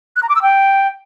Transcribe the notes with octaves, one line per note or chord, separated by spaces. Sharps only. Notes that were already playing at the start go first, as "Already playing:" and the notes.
F#6
A#5
D6
E6
G5